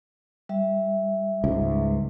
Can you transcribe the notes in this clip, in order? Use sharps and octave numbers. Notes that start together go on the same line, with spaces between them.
G3 E5
C#2 G#2